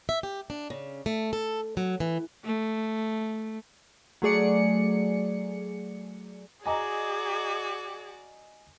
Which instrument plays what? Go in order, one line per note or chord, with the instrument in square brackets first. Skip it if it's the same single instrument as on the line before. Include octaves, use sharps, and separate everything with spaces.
[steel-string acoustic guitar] E5
G4
D4
C#3
A3
A4
F#3
E3
[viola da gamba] A3
[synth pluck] F#3 A3 G#4 D5 C#7
[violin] F#4 D5 [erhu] G#4 [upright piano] D#5 G#5 A#5 [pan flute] D6